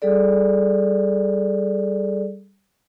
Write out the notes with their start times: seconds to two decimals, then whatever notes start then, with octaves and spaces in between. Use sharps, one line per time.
0.02 G3 G#4 A4 D5